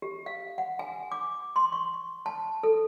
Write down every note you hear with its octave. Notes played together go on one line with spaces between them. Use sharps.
G4
F5
F#5
G#5
D6
C6
C#6
A5
A4